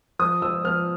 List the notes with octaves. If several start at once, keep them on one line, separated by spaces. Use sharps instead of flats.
F3 D#6
F3 E6
F3 F6